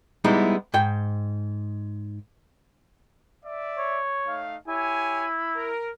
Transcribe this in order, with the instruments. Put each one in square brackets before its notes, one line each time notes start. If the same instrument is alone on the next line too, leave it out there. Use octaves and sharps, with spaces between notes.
[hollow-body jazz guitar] G3 G#3 B3 D#4 E4
G#2 G5
[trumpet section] D5 E5
[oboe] C#5
[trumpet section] A3 D#4 F5
[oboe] E4 [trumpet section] G4 C#5 G#5
[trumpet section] A#4